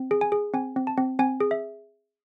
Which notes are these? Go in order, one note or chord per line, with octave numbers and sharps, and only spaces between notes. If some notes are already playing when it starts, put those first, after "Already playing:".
Already playing: C4
G#4
G#5
G#4
C4 G#5
C4
A5
C4
C4 G#5
G#4
E5